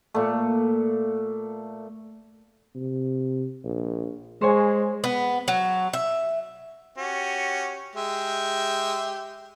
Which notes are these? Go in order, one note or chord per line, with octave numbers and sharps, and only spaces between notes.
A#2 A3
C3
A#1
G#3 C5 C#5 G#5
B3
F#3
E5
C#4 F#4 G4
G#3 G4 E5